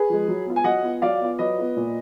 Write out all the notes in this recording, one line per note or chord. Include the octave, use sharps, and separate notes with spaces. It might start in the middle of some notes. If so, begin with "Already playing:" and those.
Already playing: G#4 B4
F3 G#3
F#3
B3 F4
G#5
F#3 D#5 F#5
B3 F4
F#3 D5 F5
B3 F4
F#3 B4 D#5
B3 F4
A#2